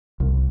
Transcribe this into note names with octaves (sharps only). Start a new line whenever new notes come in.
C2